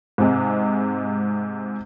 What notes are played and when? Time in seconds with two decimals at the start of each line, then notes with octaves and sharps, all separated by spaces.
0.18 G#2 C3 G#3